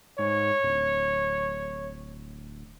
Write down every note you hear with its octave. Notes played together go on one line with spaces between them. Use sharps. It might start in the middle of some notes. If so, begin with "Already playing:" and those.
G#2 C#5
D1